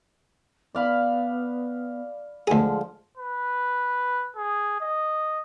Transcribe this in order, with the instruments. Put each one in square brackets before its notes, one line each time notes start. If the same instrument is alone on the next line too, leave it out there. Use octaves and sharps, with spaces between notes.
[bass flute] B3 [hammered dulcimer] D5 F5 B5
[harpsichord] D2 G#4 [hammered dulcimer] D3 F3 [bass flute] G#3
[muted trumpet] B4
G#4
D#5